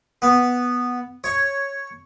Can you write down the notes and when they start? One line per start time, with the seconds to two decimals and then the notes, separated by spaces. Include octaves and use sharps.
0.22 B3
1.24 C#5